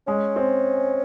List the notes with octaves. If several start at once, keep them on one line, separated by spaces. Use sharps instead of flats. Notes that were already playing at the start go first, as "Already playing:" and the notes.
G#3 C#4
C4